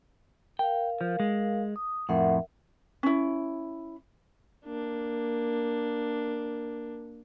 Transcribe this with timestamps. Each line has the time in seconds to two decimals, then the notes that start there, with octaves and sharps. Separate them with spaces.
0.59 A#4 F5 G5
1.01 F3
1.20 G#3
1.76 D#6
2.09 F2 A2 A#4 E5 F#5
3.03 C#4 E4
4.65 A#3 D4